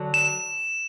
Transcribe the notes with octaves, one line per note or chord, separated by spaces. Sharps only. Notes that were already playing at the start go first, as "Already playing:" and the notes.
Already playing: D3 F#3
E7